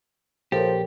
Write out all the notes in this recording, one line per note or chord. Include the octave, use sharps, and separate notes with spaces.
A#1 F3 G4 A4 A#4 C#5